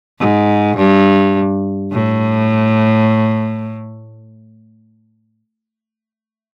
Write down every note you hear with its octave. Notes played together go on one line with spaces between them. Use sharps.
G#2
G2
A2